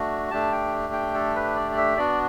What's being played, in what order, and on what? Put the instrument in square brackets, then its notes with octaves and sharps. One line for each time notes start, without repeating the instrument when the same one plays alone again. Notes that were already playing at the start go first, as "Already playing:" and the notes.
Already playing: [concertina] A3 D4 F#4
A3 D4 G4 A5
G5
G5
A4
B4
D5
D5
E5
B3 D4 F#4 D5